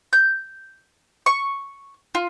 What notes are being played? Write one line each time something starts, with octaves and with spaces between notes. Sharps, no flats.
G6
C#6
F4